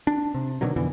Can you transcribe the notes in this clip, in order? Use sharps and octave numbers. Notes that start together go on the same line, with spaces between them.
D4
C3
B2 D3 D#3 F#3
F2 B2 D3 E3